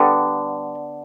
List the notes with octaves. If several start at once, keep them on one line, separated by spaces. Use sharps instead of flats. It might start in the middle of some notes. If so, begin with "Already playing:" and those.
Already playing: D3 G3 B3